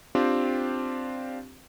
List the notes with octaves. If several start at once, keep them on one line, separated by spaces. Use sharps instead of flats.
C4 D4 F4 G4